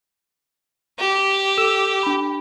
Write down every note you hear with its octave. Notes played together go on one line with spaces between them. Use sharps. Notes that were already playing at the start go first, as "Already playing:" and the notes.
G4
A4 E6 E7
D4 B5